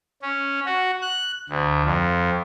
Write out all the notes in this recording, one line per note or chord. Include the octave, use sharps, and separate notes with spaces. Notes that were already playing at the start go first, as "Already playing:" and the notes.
C#4
F#4
F#6
D2
F2